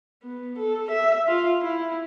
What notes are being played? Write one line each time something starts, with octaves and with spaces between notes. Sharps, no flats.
B3
A4
E5
F4
E4